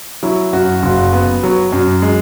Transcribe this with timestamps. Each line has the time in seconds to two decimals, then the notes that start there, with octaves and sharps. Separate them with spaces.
0.23 F#3 E4
0.53 F#2 F#4
0.83 F#1 F#4
1.13 B3
1.43 F#3
1.73 F#2
2.02 G#3